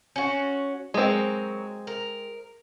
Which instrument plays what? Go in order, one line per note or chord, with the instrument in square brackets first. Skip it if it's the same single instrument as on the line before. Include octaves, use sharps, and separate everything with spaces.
[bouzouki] C#4 F#4
[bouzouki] F#3 A#4 [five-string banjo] G#3 C4
[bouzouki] A#4